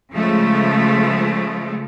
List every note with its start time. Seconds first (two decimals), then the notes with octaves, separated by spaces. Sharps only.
0.12 C#3 F3 G#3 A3